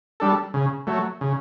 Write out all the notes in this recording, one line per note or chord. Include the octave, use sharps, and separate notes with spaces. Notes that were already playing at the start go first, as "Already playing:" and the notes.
G3 D4 A4
C#3
F#3 A3
C#3